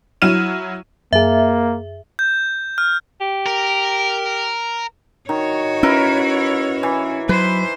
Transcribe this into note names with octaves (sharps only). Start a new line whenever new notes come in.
F#3 E4 F6 D#7 E7
F#2 A#3 G#4 E5
G6
F6
G4
A#4
D#3 F#4 C#5
C#4 E4 A#4 B4
E3
F#3 B4 C5